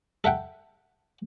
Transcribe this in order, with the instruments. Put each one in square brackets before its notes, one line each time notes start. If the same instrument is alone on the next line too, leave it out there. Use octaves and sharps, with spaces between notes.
[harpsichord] A4 E5 F#5 G5